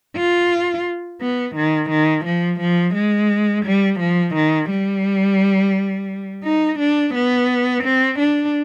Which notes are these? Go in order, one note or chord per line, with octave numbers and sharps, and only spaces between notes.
F4
B3
D#3
D#3
F3
F3
G#3
G3
F3
D#3
G3
D#4
D4
B3
C4
D4